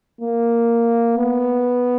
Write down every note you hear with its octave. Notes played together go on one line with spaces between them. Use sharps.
A#3
B3